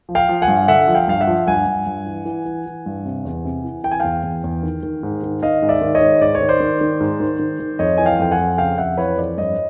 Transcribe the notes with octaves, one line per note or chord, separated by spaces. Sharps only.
F3
F5 G5
F3
F#5 G#5
G2
D3 E5 F#5
F3
F5 G5
G2 F5
E5 F#5
F3
G2 F#5 G#5
G2
G2
E3
E3
E3
E3
G2
C3
E2
C3
E3
E3 G5
G#5
E2 F5 G5
E2
E2
D#3
D#3
G#2
D#3
D#3 D#5 F5
G#2
D5 E5
D#3
C#5 D#5
G#2
G#2 D5
C#5
D#3
C5 D5
D#3
D#3
G#2
D#3
D#3
D#3
F2 C#5 D#5
E3 G#5
F5 G5
F2 G5
F#5 G#5
F2
C#3 F5 G5
F2 E5 F#5
E3 B4 C#5
F2 C5 D5
G2 C#5 D#5